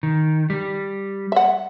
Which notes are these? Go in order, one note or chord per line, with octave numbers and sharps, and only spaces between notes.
D#3
G3
E5 F#5